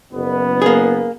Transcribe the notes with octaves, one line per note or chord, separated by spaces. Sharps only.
F#1 B3
A#3 G#4